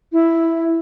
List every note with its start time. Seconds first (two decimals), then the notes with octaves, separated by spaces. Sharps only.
0.13 E4